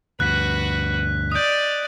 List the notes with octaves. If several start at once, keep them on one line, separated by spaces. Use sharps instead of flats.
D2 G2 F#4 B4 F#6 B6
D5 D#5 D#6 G6